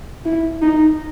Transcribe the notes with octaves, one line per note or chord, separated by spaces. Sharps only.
E4
D#4